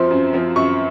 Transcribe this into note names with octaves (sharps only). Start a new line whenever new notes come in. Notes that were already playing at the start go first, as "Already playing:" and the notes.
Already playing: F#2 F3 C4 C6
F#2
F3 C4
F#2 C#6